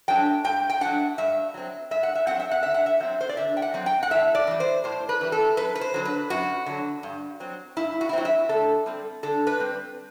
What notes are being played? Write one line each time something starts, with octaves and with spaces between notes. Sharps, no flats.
F#3 A3 D4 G5
G2 G5
G5
F#3 A3 D4 F#5
G2 E5
F#3 C4
G2 E5
F#5
E5
F#3 C4 F#5
E5
F#5
D3 E5
F#5
E5
F#3 C4
C5
D5
D3 E5
G5
F#5
F#3 C4
G5
F#5
A2 E5
D5
E3 G3
C5
A2 C5
B4
E3 G3
A4
F#2 B4
B4
C5
D3 F#3
B4
F#2 F#4
D3 F#3
G2
F#3 C4
G2 E4
F#4
E4
F#3 C4 F#4
E5
D3 A4
G3 C4
D3 A4
B4
G3 C4